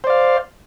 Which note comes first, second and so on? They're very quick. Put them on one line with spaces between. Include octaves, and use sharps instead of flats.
C5 D5 F5